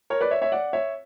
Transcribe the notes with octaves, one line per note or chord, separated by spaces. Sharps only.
A#4 C#5
B4 D5
C#5 E5
C#5 E5
D5 F#5
C#5 E5